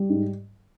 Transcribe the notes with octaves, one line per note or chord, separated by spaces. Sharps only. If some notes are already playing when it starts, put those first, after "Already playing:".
Already playing: G3
G#2